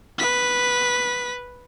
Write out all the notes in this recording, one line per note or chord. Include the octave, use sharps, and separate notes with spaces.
B4 B6